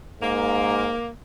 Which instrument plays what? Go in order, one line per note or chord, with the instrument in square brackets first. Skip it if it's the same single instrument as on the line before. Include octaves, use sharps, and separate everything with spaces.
[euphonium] G#2 [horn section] A#3